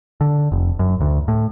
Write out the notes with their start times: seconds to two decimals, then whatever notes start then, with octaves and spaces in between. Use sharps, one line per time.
0.21 D3
0.52 F1
0.79 F#2
1.01 D2
1.28 A2